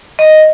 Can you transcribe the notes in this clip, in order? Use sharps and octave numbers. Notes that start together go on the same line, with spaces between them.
D#5